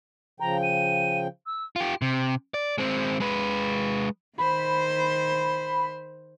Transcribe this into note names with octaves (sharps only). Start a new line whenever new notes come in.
C#3 F3 G5 A#5
D#7
E6
F4 G4
C3
D5
G#3 C4
G#3 B4
D#3 C5 B5